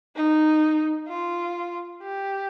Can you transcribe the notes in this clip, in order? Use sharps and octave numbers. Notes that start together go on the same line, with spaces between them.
D#4
F4
G4